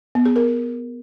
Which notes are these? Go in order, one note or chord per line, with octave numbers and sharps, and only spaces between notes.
B3
G#4
A#4